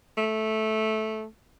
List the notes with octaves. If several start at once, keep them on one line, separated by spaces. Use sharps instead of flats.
A3